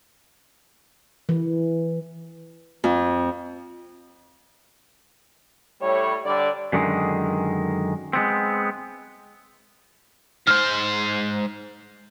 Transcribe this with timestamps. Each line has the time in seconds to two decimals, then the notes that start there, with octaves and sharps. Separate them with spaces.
1.29 E3
2.84 F2
5.81 A2 G3 C#5
6.25 D3 G3 D5
6.73 F#2 D3 D#3 G#3
8.13 G#3 B3 C4
10.47 G#2 C5 F6